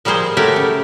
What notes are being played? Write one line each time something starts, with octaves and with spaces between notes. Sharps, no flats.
F3 G3 A#3 G#4 C5
A3 G4 A#4 C#5 F#5
C#3